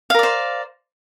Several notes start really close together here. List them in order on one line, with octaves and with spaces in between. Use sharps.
F5 A#4 D5 C5